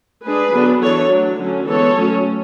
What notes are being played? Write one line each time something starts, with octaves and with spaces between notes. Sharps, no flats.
G#3 D4 G#4 B4
D3 F#3 B3 D4
E3 B3 D4 A4 C#5
F#3 A3 D4
D3 F#3 A3 C#4
E3 G#3 B3 A4 C#5
F#3 A3 C#4